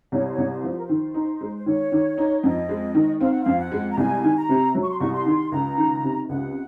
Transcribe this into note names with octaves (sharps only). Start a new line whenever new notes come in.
C2 C#5
C5
C#5
C2
C5
F3
C5
A#4
D#3 C5
D#4
G#3
C5
D#3 C#5
D#3
D#4
F2 D#5
G#3
D#3
C4 F5
F#5
F2 F5
F#5
G#3
A#5
C2 G#5
D#3
A#5
C3
F#3
C#6
C6
C2 C#6
C6
D#3
C#2 A#5
D#3
C3
C#2 F#5